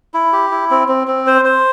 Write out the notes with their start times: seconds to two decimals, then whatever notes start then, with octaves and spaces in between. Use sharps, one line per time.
0.14 E4
0.33 G4
0.51 E4
0.71 C4
0.88 C4
1.07 C4
1.27 C5
1.45 C5